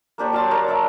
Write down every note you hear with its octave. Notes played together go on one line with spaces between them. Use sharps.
A#3 D4 G4 C#5
F#3 F5 A5 C6
A#4 C#5 D5 A#5
D4 A#4 D5 E5